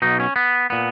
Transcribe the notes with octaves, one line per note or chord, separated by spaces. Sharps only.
B1 B2 D#4
C#4
B3
A#2 B3